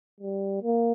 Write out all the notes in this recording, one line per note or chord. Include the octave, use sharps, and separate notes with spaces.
G3
A#3